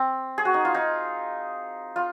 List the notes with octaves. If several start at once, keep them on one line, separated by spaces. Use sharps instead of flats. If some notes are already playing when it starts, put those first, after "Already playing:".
Already playing: C4
G#4
F#4
D#4
F4
D#4
F4